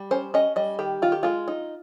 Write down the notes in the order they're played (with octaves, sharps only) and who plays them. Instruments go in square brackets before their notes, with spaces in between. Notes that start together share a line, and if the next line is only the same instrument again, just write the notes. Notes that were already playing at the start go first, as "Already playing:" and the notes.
Already playing: [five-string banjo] G3
C#4 C5
C#4 D#5
G3 D#5
D#3 G4
D#3 F4
G4
G#3 F4
D#4